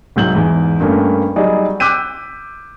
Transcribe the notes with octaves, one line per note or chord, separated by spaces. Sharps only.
C2 G#2 F#3 G6 F#7
E2 G#2
G2 A3 A#3 C#4
F#3 G3 D#4 F#4 G#4 D5
D6 E6 F#6 G6 B6 D#7